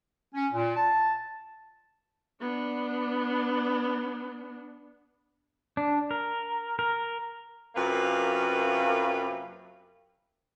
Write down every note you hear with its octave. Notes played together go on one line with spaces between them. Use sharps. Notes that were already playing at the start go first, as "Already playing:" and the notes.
C#4
A#2
A5
B3 D4
D4
A#4
A#4
F#2 C3 A#3 F4 B4